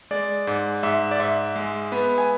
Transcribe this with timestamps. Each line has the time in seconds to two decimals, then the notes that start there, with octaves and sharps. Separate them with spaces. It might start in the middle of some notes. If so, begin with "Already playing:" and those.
0.11 G#3 D5
0.47 G#2
0.83 G#2 E5
1.11 D5
1.20 G#2 E5
1.56 G#3
1.92 B3
2.18 G#5